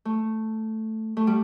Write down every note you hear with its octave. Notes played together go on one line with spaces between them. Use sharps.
A3
A3
G3